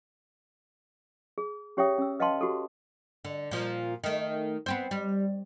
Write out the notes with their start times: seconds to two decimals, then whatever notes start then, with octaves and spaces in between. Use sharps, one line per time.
1.38 G#4
1.77 C#4 G4 C#5 E5 G5 D#6
1.98 C#4 E6
2.20 B4 D#5 F5 G5 A5 C6
2.41 F#4 G4 A4
3.25 D3
3.51 A#2 F3
4.04 D#3 A3
4.66 B3 C4 C5
4.91 G3